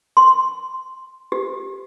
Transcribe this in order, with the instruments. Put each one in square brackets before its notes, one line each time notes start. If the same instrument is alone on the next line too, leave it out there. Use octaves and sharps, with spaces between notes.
[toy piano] C6
G4